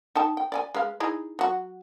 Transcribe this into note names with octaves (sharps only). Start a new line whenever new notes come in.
D#4 G5 A5
G5
D5 G5 G#5
G#3 B4 F5
D#4 E4 G#4
F#3 F#4